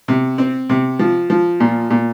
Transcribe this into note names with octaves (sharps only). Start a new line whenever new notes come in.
C3
C4
C3
F3
F3
A#2
A#2